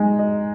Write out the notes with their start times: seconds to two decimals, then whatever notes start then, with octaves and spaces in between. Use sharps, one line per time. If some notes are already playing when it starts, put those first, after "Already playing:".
Already playing: G#3 D#4
0.19 D#5